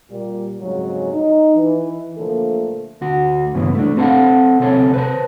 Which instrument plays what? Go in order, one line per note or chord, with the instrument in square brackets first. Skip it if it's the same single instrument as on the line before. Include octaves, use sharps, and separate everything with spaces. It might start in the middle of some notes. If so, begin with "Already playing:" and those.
[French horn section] A#2 G3
F2 G#2 C#3 F#3 G#3 D#4
D#4
E3
A#2 D3 F3 A3 A#3 A4
[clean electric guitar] D2 F#4
G2 C#3 E3 B3
A3 D4
C4 G4 A4 A#4 F5 F#5
D2 C3 C4 A4 C#5
B4 C5 A5